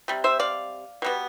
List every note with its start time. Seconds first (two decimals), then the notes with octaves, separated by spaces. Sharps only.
0.08 C3 G3
0.24 C5 E5
0.39 D5 F5
1.02 B2 G3 B3